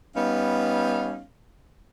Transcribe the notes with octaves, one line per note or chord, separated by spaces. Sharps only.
G3 B3 C#4 D#4 F5